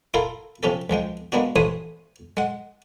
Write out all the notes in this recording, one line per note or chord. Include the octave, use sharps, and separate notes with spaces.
E4 F4 A4 A#4 F5
C3 F3 C#4 G4 A4
C#2 F3 G#3 G5
G#3 A#3 B3 D4 F#4
A1 E3 A3 C5 C#5 D#6
G#3 F#5